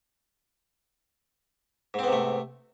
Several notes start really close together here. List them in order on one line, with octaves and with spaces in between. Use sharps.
G#2 C4 B3 C3 A3